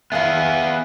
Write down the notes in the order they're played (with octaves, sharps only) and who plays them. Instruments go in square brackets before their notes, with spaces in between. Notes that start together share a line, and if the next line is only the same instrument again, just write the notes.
[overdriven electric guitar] B3 G#4 [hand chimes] E5 F5